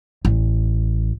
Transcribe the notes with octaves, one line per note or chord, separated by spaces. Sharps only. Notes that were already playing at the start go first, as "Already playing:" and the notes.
A1